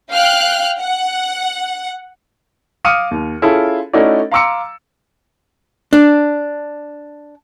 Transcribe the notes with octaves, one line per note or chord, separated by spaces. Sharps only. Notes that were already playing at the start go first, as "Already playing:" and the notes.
F5 G5 F6 F#6
F#5
F5 D6 D#6 F6 C#7 D#7
D#2
C#4 E4 F4 G#4 A4
A3 C#4 D#4 E4 F#4 D5
F5 A#5 C6 D6 E6 C#7
D4